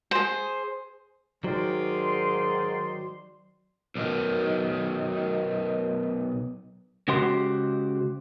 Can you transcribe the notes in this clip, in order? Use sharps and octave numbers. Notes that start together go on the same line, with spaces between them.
G#4 C5
G#2 D#3 F#3 D5 C6
B1 D#3
C#3 G#3 F#4 G4 C5 C6